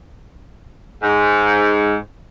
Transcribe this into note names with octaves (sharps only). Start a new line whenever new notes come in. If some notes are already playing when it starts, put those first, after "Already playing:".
G#2